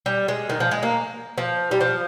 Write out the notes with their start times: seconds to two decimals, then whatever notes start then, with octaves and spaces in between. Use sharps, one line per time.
0.06 G3
0.28 G#3
0.50 D#3
0.60 F3
0.71 G#3
0.83 A#3
1.38 F3
1.71 G3
1.81 F3